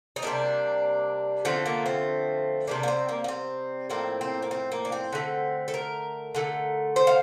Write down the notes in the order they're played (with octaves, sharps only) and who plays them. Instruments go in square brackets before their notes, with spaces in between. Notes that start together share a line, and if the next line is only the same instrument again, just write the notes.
[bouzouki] D#4
C3 G3 A#3 D4
D3 F3 A3 C4
A#3
C4
C3 G3 A#3 D4
A#3
C4
A#3
A#3
C4
A2 F3 A#3 C4
C4
A#3
C4
A#3
D4
C4
D3 A3
A4
A#4
D3 A3
C5
F5